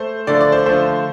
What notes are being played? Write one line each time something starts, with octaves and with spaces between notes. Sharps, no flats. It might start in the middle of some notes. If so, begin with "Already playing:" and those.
Already playing: A3 C5
D3 F3 A3 D5
D5
C5
D3 F3 A3 C5